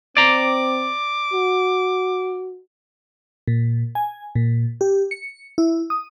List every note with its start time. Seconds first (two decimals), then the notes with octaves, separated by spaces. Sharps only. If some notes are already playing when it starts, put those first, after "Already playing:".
0.17 C4 D5 A#5 D6
1.33 F#4
3.48 A#2
3.95 G#5
4.35 A#2
4.81 G4
5.11 C#7
5.58 E4
5.90 D#6